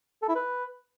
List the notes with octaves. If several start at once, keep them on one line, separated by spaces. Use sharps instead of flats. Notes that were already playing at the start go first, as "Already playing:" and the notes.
A4
E4
B4